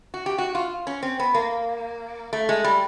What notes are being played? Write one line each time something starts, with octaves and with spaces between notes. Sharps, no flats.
F#4
G4
F#4
F4
C#4
C4
B3
A#3
A3
G#3
G3